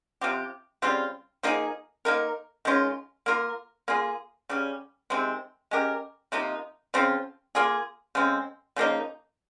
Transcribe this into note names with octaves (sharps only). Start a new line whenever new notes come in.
C3 F3 C4 G4
C#3 G3 C4 F4
F3 A#3 D#4 G#4
A#3 D#4 A#4
D#3 G#3 C#4 F4
A#3 F4 A#4
A#3 F4 G#4
C#3 G3 C#4
C3 D#3 G#3 C4
G#3 C#4 G4 A#4
C3 F3 A#3 D#4
C#3 F3 C4 F4
A#3 F4 G#4
C#3 G#3 C4
C#3 F3 A#3 D#4